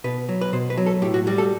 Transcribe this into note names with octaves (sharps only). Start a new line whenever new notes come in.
B2 B4
F#3
B4
B2 C5
B4
F#3
A4
A2 G4
F#4
G3 F#4
A4